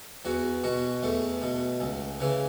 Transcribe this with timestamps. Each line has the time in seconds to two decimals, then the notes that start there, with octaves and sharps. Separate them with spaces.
0.25 E2 F#4
0.64 B2 F#4
1.03 E2 A3
1.42 B2
1.80 C#2
2.20 C#3 E3